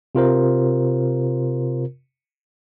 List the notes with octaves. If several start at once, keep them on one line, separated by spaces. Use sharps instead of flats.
C3 F4 A#4 C5